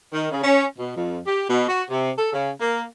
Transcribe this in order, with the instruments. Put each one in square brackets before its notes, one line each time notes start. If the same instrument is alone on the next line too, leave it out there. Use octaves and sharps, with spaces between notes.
[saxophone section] D#3
C#3
C#4
B2
F2
G4
B2
F#4
C3
A4
C#3
A#3